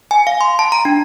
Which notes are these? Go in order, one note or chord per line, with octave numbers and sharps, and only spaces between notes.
G#5
F5
C6
A5
A#5
D4